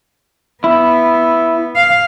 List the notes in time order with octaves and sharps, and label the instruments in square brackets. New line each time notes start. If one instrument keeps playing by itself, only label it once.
[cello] B3 [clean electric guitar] E4
[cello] F5